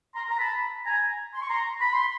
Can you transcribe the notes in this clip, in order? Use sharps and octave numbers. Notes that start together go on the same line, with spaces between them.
A#5 C6
A#5
A5 B5
G#5 A#5
C6
C#6
A#5 C6
B5
C6